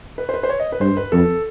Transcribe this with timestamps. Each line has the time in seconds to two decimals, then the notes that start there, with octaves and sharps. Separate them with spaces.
0.18 B4
0.29 C5
0.34 B4
0.43 C5
0.49 C#5
0.59 D#5
0.72 B4
0.81 G2 C5
0.97 B4
1.12 F2 A4